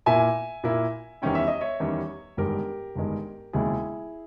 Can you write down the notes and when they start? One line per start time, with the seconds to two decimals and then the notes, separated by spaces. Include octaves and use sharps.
0.06 A#2 A#3 E4 E5 G#5
0.64 A#2 A#3 E4
1.22 E2 D#3 G3 C#4 E4 G5
1.35 E5
1.48 D#5
1.61 C#5 E5
1.80 E2 D#3 G3 C#4 E4
2.37 G1 G2 D#3 G#3 G4 A#4
2.95 G1 G2 D#3 G#3
3.53 E1 D#2 C#3 G#3 E4 G#4